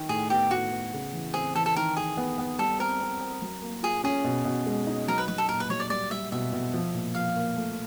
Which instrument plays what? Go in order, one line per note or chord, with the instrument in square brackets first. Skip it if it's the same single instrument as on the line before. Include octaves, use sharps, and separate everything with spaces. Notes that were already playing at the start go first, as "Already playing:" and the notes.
Already playing: [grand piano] D#3
[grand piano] A2 [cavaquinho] G#4
[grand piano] B3 [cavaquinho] G4
[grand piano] A2 [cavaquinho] F#4
[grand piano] B3
C#3
E3
[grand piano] C4 [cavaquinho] G#4
[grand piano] E3 [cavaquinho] A4
[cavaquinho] A4
[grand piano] D#3 [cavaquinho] A#4
[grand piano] D#3 [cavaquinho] G#4
[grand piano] B3
B3
[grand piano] G3 [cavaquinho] A4
[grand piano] C4 [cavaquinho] A#4
[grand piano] C4
C4
F#3
A#3
[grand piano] F4 [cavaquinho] G#4
[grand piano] C#4 [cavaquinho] G#4
[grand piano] B2
B2
G#3
D#4
[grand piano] F#3 [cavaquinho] A#4
[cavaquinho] B4
[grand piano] F#3 [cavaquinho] B4
[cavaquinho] A4
[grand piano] A#2 [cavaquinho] A#4
[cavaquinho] B4
[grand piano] F#3 [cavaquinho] C#5
[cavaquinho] D5
[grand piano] G3 [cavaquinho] D5
[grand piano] G3 [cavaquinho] E5
[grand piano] B2 [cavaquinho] E5
[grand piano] B2
F3
A#2
[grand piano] F3 [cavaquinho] F5
[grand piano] A#3
A3